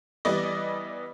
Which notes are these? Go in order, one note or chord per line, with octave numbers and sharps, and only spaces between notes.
E3 G3 B3 D5 D#5